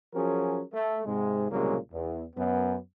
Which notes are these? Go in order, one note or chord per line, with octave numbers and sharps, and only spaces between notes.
F3 F#3 C#4 F#4 G#4 A#4
A3
G#2 C3 G#3
C2 A#2 C#3 F#3 G#3 A#3
E2
F#2 B3